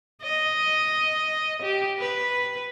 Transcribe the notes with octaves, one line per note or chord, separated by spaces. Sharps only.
D#5
G4
B4